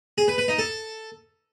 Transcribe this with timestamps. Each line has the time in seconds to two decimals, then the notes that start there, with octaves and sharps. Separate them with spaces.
0.18 G#4
0.28 B4
0.38 B4
0.48 D#4
0.58 A4